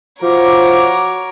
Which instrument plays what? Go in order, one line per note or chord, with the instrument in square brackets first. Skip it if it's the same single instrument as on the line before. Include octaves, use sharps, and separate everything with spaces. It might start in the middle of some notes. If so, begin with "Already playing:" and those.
[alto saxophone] F3 [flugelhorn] F#4 [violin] A#4 C#5 [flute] D6